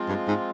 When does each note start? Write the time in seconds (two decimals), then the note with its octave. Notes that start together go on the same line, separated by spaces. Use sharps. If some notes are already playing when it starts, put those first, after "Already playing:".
Already playing: F3 G#3 C4 F4
0.09 G2
0.28 G#2